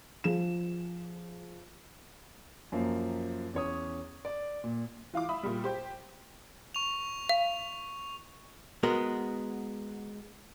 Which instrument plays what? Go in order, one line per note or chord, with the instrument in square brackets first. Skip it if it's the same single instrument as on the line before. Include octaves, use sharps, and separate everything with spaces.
[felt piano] F3 G#4 E7
[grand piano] F#2 F3 A#3
E2 C#4 C#5 D#6
D5
A#2
[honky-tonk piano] E3 F4 F5 D6
E5 B5 D#6
A#2 G3
G4 C5 G5
[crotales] C#6 F7
[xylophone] F5
[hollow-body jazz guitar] G#3 B3 F#4 A#4